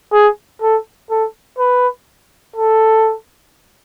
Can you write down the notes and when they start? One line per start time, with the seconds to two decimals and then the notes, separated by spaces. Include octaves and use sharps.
0.13 G#4
0.62 A4
1.10 A4
1.58 B4
2.56 A4